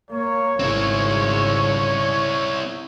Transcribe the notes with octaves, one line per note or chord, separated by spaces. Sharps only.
A#3 C#5
G#1 C#3 C4 E4